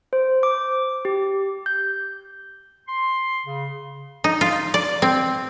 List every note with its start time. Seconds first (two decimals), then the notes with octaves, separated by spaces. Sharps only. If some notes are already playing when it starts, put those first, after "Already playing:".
0.13 C5
0.43 D6
1.05 G4
1.66 G6
2.88 C6
3.46 C#3
4.24 D#4
4.41 F4
4.74 D5
5.02 C4